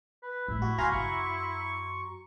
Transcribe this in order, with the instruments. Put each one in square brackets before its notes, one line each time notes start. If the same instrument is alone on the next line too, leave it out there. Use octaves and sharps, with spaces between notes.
[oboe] B4
[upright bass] A2 A3 [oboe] E4
[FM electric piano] F#4
[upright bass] G#1 C#3 [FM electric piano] F#4 A#5 C6 [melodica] F5 G#5
[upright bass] F#2 [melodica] C#6